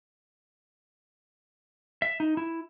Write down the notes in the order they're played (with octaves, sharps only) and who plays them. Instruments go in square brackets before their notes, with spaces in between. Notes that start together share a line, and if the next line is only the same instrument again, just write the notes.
[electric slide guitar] E5
D#4
E4